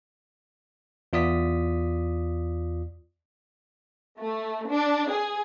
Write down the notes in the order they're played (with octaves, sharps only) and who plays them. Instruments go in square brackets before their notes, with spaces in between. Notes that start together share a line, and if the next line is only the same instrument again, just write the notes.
[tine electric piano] E2 F4 D5 D#6 B6
[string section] A3
D4
G#4